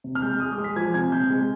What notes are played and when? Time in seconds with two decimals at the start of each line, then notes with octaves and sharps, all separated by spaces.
0.04 C3
0.15 F6
0.22 G#3 G6
0.40 G#3 D#6
0.52 D6
0.58 G#3
0.64 B6
0.76 F3 G#6
0.94 C3 G#6
1.12 C3 G6
1.30 G#3